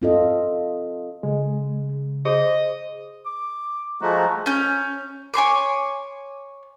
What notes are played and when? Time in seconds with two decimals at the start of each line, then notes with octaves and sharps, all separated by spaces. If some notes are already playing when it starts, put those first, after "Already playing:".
0.02 C4 F4 A4 D#5
1.23 C#3 G#3
2.25 G#4 C5 D#5
3.26 D6
4.01 F3 G#3 A3 F#4 A#5
4.46 C#4 G6
5.34 C#5 G#5 C6 D6